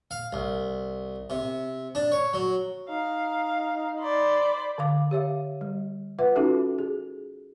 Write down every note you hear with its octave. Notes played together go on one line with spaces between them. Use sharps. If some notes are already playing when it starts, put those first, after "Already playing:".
F5
C2
C3
D4
C#5
F#3
D#4 F5
C5 D5 B5
D3 F5 D6
G4 C#5 E5 F5
G3
F4 B4 E5 F#5
C#4 D#4 F4 F#4 A4 E5
G#4